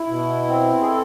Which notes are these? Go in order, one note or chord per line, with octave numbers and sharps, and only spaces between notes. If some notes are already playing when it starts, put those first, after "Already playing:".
Already playing: E4
B2
C4
G#4
A4